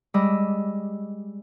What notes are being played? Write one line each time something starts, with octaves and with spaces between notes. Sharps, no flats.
G3 G#3 D#5 B5 D6 E6